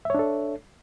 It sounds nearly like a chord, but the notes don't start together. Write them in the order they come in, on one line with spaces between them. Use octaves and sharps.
E5 C#5 D4 A4